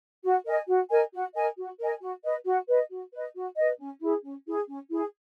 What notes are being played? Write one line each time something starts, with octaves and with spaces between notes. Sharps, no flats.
F#4
A#4 D#5 G#5
F#4
A#4 D#5 G#5
F#4
A#4 D#5 G#5
F#4
A#4 D#5 G#5
F#4
B4 D#5
F#4
B4 D#5
F#4
B4 D#5
F#4
B4 D#5
C#4
E4 G#4
C#4
E4 G#4
C#4
E4 G#4